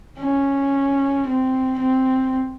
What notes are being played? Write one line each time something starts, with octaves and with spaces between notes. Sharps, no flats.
C#4
C4
C4